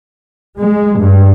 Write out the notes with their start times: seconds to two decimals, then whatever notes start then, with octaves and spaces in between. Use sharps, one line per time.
0.58 G#3
1.00 G2